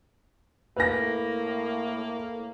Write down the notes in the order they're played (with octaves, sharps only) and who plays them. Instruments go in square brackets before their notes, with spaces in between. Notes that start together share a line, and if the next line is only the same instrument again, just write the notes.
[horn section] A2 A#3 [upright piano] B4 A#6